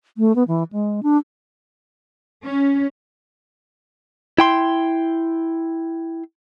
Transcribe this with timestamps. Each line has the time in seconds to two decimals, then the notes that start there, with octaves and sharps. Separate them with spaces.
0.17 A3
0.36 B3
0.48 E3
0.72 G#3
1.03 D4
2.44 C#4
4.38 E4 G5 C6